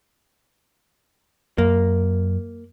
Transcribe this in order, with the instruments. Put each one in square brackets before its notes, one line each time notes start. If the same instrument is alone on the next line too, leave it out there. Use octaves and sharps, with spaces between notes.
[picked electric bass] F#2 [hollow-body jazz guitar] A#3